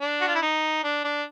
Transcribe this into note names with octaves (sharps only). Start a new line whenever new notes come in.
D4
F#4
F4
E4
D#4
D4
D4